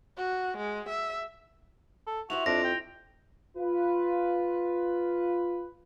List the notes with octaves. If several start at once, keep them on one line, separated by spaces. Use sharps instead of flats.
F#4
G#3
E5
A4
E4 F#4 G4 C5 F7
F2 D4 A#6
G5
F4 B4